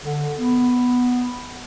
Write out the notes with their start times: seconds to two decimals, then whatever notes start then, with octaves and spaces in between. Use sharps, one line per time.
0.04 D3
0.38 B3